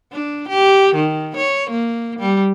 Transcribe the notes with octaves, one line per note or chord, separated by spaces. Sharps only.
D4
G4
D#3
C#5
A#3
G3